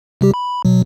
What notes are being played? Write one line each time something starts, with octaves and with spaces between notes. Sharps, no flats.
C3 G3 G4
B5
B2 F#3